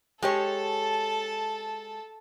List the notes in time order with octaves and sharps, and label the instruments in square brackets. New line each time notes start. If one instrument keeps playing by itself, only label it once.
[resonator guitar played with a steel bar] G#3 G4 C#5 [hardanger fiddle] A4 A5